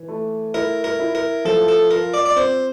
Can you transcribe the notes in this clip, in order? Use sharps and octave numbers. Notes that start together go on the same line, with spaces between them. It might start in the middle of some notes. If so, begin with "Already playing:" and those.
Already playing: E3
A3
E4 A#4
A#4
E4
A#4
F3 A4
A4
F4 A#4
D5
D5
C4 C5